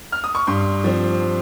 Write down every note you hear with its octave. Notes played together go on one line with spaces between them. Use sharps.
F6
D#6
C#6
G2 C6
F3 C4